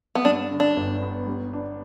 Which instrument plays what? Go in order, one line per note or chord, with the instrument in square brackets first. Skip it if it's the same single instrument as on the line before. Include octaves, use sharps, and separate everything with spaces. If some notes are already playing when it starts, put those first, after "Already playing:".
[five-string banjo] B3
[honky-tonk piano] G2 [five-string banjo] D4
[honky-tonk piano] D3
[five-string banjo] D4
[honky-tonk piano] G1
B3
G3
D4